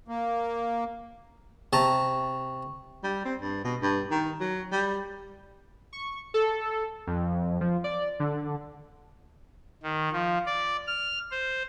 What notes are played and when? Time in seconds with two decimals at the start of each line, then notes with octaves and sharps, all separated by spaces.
0.08 A#3
1.73 C3 A5 A#5 C#6
3.04 G3
3.25 C4
3.41 G2
3.64 B2
3.82 G2
4.11 D#3
4.40 F#3
4.72 G3
5.93 C#6
6.34 A4
7.07 F2
7.61 F3
7.84 D5
8.20 D3
9.83 D#3
10.12 F3
10.46 D5
10.87 F6
11.31 C5